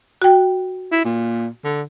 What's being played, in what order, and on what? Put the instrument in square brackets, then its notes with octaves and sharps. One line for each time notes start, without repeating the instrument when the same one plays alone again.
[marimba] F#4 G5
[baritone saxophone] E4
A#2
D3